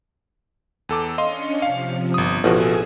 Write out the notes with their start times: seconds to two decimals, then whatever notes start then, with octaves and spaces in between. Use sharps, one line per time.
0.89 E2 A4 D6
1.18 C#4 D4 D#5 F5 C6 C#7
1.62 C3 F3 F5
2.14 G1 D#6
2.44 A1 B2 F3 F#4 G#4 G#5 E6